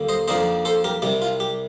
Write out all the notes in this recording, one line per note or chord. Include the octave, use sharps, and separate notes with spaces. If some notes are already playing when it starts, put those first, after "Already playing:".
Already playing: D#2 D3 G3 A#3
C5 D#5
F2 D#3 A#3 D4 C5 D#5
A4 C5
G4 A#4
C2 C3 G3 G4
F4
G4